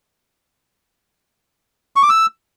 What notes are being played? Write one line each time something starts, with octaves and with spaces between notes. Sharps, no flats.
C#6
D6
E6